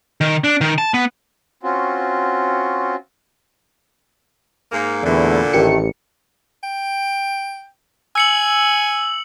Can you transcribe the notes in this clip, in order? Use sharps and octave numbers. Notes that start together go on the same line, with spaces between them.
D#3
D4
D#3
A5
B3
C4 C#4 F4 F#4
G#2 A#3
E2 A#2 D3 A3 E4
A1 D#3 A3 G4 A#4 C#7
G5
G#5 E6 C#7 F#7